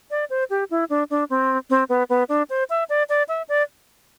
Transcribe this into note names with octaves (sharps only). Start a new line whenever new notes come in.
D5
C5
G4
E4
D4
D4
C4
C4
B3
B3
D4
C5
E5
D5
D5
E5
D5